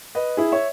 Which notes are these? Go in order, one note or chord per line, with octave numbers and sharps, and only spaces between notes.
B4 D#5
E4 G#4
C#5 E5